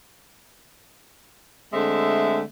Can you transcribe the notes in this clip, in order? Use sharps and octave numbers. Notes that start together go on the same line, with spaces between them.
D3 G#3 A3 C4 E5